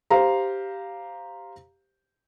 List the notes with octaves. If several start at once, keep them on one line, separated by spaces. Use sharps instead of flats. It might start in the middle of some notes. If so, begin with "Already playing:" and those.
G4 C5 F5 A#5